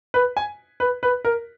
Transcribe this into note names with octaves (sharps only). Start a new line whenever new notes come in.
B4
G#5
B4
B4
A#4